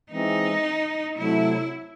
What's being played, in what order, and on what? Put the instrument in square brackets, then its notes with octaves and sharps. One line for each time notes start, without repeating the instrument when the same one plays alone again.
[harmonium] E3 G#3 C4 [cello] D#4
[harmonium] C3 F#3 A3 [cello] E4